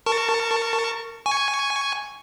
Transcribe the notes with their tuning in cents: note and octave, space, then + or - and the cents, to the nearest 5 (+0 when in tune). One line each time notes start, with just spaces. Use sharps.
A#4 -20 A5 +15 C#6 +0
G#5 +0 C#6 +5